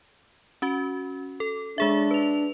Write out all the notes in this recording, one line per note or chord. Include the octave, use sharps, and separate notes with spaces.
C#4 F#4
A4
G#3 D4 G#4 E5
B4 F7